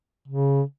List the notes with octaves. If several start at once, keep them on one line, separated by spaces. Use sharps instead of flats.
C#3